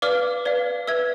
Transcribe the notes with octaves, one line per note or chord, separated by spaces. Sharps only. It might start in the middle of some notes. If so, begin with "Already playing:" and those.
B4 D5 F5 D6 F6
B4 D5 F5
B4 E5 E6 G#6